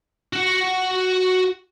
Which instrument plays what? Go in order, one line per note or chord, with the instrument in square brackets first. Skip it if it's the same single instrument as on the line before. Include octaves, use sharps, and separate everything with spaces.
[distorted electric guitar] F#4 F#5